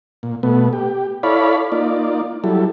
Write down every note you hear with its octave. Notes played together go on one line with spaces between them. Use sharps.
A#2
B2 A3 B3
G4
E4 A4 C#5 D5 F5 B5
A#3 D#4 F4 D5
F#3 G3 E4 A4